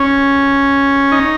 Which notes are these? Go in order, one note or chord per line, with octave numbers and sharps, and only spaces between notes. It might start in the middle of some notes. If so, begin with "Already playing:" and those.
Already playing: C#4
D#4